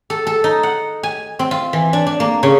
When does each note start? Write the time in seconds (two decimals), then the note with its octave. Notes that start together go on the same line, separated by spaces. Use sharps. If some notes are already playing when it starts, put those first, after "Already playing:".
0.10 A4
0.27 A4
0.44 D#4
0.63 F#5
1.03 G#5
1.39 C4
1.51 F4
1.73 E3
1.93 D4
2.06 D4
2.20 A#3
2.43 C#3